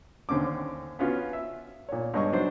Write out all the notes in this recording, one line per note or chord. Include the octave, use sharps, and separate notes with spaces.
D#2 D3 C4 C#4 D6
B3 C#4 F4 F#4
E5
A#2 C#5
G2 G#3 C#5 D#5 G#5 C#6
F#3 D4 C5